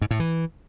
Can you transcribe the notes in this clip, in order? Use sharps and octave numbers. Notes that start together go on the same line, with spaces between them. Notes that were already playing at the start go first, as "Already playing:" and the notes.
G#2
A2
E3